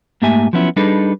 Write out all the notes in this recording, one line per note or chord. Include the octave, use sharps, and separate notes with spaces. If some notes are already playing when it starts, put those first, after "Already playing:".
G#2 A3 A#3 G4 E5 G#5
F3 F#3 B3 C#4 E4
G3 D4 D#4 G#4 A4 B4